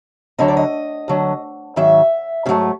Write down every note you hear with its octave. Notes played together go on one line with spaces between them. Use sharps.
D2 D3 F#3 D#5
D5
D#5
D2 D3 F#3
G#2 D#3 F#3 E5
G#2 D#3 F#3 A3